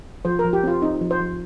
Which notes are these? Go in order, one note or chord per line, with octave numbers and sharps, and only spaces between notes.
F3 C5
A#4
F3
G4
C4 F4
C4 D#4
F3
C5
F3